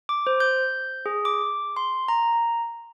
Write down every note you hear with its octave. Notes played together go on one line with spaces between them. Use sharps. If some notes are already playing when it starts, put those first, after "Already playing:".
D6
C5
G6
G#4
D6
C6
A#5